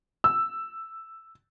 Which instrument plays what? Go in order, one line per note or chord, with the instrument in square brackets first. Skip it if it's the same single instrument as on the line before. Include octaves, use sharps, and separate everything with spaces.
[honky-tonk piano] E6